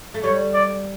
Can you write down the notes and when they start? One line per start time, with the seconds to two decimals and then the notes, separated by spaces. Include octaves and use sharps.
0.14 A3
0.23 G3 C#5
0.54 D5